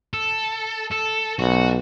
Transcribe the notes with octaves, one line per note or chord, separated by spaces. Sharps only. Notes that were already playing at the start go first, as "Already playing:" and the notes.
A4
A4
B1 F#4